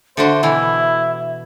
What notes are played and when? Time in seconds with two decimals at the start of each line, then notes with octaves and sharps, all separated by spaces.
0.17 D3 D4 F#4 C5 E5
0.43 B2 E3 E4